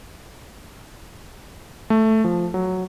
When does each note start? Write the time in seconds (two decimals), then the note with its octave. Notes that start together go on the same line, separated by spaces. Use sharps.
1.90 A3
2.24 F3
2.54 F#3